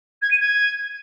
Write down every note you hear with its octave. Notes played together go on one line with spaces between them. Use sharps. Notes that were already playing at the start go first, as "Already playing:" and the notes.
G#6
D#7
G#6